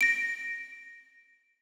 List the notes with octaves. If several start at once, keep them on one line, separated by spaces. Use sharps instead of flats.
A#6 D7